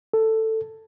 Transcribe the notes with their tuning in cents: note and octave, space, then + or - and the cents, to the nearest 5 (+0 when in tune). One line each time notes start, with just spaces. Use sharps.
A4 +10